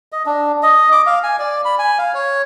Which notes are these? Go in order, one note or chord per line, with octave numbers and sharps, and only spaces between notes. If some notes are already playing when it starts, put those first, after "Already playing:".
D#5
D4
D#5
D6
F5
G#5
D5
B5
G#5
F5
C#5